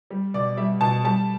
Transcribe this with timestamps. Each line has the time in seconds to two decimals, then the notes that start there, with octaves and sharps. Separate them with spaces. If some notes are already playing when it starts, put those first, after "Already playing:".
0.11 G3
0.34 B2 D5
0.57 G3 E5
0.81 B2 A5
1.05 G3 A5